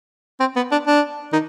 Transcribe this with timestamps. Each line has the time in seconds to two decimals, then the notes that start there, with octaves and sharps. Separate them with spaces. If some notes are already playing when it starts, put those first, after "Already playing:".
0.40 C4
0.56 B3
0.72 D4
0.87 D4
1.33 D#3